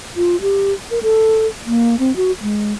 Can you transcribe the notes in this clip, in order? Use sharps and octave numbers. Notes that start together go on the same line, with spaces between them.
F4
G4
A#4
A4
A#3
C4
F#4
G#3